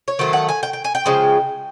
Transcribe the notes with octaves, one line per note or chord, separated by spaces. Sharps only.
C#5
D#3 F#3 A3 C5
F#5
G#5
G5
G5
G#5
G5
C#3 F3 G#3